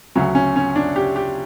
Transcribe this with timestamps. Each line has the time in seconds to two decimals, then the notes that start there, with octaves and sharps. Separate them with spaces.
0.15 D2 C#3 F#3 C#4
0.35 C#4
0.56 C#4
0.76 D4
0.96 G4
1.16 G4